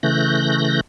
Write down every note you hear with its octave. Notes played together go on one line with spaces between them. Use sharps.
C#3 E3 A3 F#6 G6 A#6